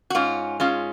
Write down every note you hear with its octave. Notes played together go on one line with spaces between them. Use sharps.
F#4
G#2 C#4 F4
G#3 C#4 F4